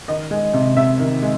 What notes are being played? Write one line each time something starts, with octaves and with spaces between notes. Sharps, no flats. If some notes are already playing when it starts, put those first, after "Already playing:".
D#3 D#5
G#3
C3
C3 E5
D#3
G#3